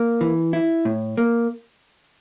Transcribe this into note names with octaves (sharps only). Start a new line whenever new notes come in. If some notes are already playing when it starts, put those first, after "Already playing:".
Already playing: A#3
E3
E4
A2
A#3